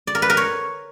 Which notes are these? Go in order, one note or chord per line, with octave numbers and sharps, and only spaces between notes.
D5
A#4
B4
A#4
C#5